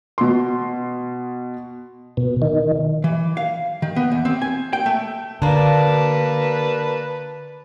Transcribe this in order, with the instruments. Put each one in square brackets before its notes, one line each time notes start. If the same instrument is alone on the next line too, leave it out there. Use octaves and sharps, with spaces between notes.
[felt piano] B2 C6
[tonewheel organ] B2
D#3
[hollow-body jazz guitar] E3
F5
D#3
B3
E2
C4
G#5
G5
A3
[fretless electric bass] D3 [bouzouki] A#3 D4 [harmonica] B4 A5